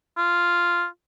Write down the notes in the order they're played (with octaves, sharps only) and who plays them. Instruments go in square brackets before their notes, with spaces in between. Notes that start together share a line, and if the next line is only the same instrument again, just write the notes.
[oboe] F4